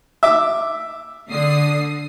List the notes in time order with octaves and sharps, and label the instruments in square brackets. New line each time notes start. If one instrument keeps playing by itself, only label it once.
[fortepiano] E5 D6
[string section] D3 D#6 C7